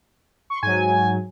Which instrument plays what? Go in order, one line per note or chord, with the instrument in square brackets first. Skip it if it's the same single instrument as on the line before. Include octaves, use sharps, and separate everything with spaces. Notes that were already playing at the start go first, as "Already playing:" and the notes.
[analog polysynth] C6 C#6
[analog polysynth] G#2 F#3 [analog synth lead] G#5